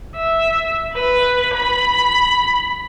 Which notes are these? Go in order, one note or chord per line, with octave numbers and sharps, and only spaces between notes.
E5
B4
B5